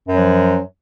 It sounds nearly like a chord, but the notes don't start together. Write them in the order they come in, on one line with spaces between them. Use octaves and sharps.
F#2 F#3 F3